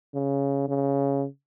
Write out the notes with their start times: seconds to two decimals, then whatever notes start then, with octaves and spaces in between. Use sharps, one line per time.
0.14 C#3
0.68 C#3